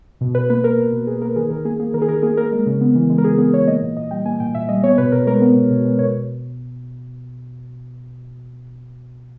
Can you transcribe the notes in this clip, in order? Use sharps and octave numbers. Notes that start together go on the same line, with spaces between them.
B2
B2 B4
A#3 B4
A#3 A#4
B2
B2
A#3 G#4
A#3 A#4
D#3 G#4
D#3 A#4
A#3 G#4
A#3 G#4
D#3 A#4
G#4
D#3 A#4
A#3 G#4
A#3 A#4
G#3
C#3
B3
E3
G#3
A#4
C#3 G#4
B3 G#4
E3 C#5
A#3 D#5
A#2
A#2 D#5
G3 G5
A#3 G#5
A#2 G5
A#2 E5
G3 D#5
B3 C#5
B2 B4
B2 A#4
G#3 A#4
B3
B2
B2
G#3
B2 C#5